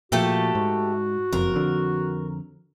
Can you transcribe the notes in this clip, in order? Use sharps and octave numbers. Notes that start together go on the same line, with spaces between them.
A#2 F3 A3 F#4 G4 A4
G#2
F#1 F2 A#4
F2 D3